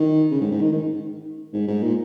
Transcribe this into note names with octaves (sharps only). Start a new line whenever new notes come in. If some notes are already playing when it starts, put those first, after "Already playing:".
Already playing: D#3
C#3
G#2
G#2
D#3
D#3
G#2
G#2
A#2